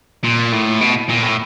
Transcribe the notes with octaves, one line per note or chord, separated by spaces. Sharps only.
A#2
A2
B2
A#2
A2